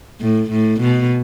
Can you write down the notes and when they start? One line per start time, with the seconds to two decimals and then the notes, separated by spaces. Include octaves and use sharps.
0.20 A2
0.50 A2
0.80 B2